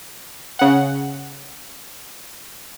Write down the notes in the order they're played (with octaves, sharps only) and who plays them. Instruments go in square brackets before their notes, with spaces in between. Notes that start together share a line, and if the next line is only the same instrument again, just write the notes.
[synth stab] C#3 F#5